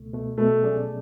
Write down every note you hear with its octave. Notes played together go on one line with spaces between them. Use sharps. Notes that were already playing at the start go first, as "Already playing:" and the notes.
Already playing: C#2 B2 A3
B2 A3
B2 A3
F#3 C#4 G#4 D5